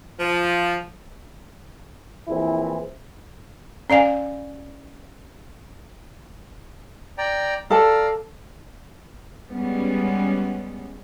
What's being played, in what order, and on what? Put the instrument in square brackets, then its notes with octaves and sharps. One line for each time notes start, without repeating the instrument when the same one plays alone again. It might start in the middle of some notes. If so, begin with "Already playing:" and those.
[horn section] F3
[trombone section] A#1 E3 C4 E4 G#4
[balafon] C#4 D5 F5 G#5
[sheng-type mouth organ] D5 G5 A#5
[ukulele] A4 A5 [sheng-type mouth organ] D5 F5 A#5
[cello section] G3 G#3 B3 C#4